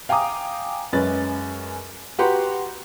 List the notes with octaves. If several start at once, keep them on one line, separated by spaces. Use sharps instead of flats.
F5 G5 G#5 A#5 D6 D#6
F#2 G#3 C#4 B4 A6
F#4 G4 B4 F#5 A#5 C6